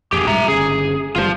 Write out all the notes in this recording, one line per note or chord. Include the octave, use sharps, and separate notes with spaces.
A1 F2 G4 G#4
B1 G#2 G3 E5 A#5
G1 C#3 G#4
F#1 B2 G3 F4 C5